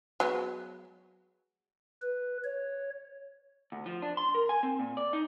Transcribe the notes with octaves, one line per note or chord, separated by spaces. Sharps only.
F#3 G#3 B3
B4
C#5
D2
F3
D4
C6
A#4
G#5
C4
A#2
D5
D#4